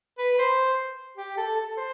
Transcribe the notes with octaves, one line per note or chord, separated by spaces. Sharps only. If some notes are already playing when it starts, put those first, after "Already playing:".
B4
C5
G4
A4
A4
C5